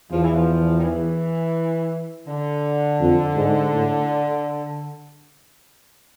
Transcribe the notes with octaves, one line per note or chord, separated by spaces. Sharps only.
E2 F3
E3
F3
D#3
E3
D3
F2
G#2
A2